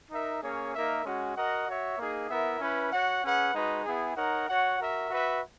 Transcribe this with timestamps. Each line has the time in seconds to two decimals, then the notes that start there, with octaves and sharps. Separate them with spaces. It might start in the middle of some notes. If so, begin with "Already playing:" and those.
0.11 D#4 A#4 E5
0.42 A#3 C#4 G#4 C#5
0.74 A#3 D#4 A#4 E5
1.04 G#3 C#4 F#4
1.35 F#4 A#4 D#5 F#5
1.66 F#4 C#5 E5
1.97 A#3 D#4 G#4
2.29 B3 E4 A#4 E5
2.60 C#4 E4 B4
2.91 F#4 C#5 F#5
3.23 C#4 G#4 B4 F#5
3.54 G#3 D#4 F#4 B4
3.84 B3 E4 G#4
4.16 D#4 A#4 C#5 F#5
4.48 F#4 C#5 F#5
4.78 F#4 A#4 E5
5.10 F#4 B4 E5